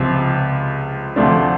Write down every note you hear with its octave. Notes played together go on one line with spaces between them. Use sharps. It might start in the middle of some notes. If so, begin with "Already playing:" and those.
Already playing: C#2 C3 F3
D2 C3 F3 A3 D4